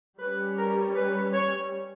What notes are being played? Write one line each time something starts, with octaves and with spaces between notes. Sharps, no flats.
G3 C#4 B4
A#4
B4
C#5